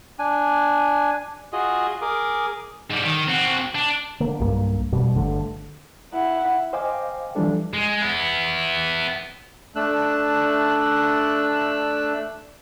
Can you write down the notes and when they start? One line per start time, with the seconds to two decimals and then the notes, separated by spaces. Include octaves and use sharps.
0.19 D4 G#5
1.53 F4 F#4 G#4 D#5
2.02 G#4 A#4 D6 D#6
2.90 G#2 G3
3.04 D#3
3.28 C4 F#4
3.75 D4
4.20 D3 A#3
4.40 B1 G2 A#3
4.92 F2 B2 G3
5.15 G1 D3 A3
6.13 E4 F#5
6.73 C5 D#5 F5 G5 G#5 D6
7.35 E3 F3 G3 D4 A4
7.74 G#3
8.02 B3 E4
9.76 A3 D4 E6 F#6